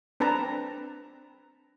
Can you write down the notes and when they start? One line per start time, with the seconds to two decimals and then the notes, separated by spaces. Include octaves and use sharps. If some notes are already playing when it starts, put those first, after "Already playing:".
0.20 C4 D4 B4 A5 A#5